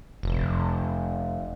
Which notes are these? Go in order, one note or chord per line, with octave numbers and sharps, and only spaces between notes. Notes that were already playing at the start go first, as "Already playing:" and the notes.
F1